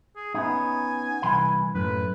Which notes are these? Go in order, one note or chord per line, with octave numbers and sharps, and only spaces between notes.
G#4
B3 C#4 D#4 G#5
C2 E3 B5
F#2 A2 B4